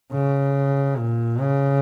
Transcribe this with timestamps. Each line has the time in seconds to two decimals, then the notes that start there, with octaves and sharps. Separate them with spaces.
0.12 C#3
0.98 A#2
1.40 C#3